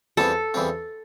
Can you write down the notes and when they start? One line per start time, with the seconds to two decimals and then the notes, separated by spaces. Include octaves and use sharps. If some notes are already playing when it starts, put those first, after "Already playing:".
0.17 E2 E3 G3 C4 F4 A4
0.54 E2 E3 G3 C4 F4